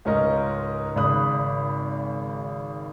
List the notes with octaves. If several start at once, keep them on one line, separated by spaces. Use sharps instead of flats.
C#2 G#2 C#4 A#4 D#5
G#1 C#3 D5 B5 D#6 F#6